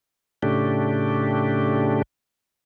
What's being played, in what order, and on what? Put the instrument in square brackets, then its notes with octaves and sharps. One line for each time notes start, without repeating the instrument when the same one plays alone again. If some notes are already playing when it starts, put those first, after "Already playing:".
[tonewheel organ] A2 C#3 A3 D4 G4